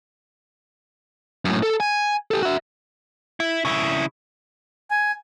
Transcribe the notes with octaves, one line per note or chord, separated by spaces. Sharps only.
F#2 A2
A4
G#5
G4 A4
F#4 E5
E4
C#3 E4
G#5